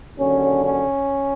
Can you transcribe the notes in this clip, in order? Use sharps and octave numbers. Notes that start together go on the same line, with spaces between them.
D#2 D3 F#3 C#4
C#4